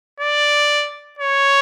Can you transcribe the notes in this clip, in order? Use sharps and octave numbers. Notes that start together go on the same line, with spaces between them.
D5
C#5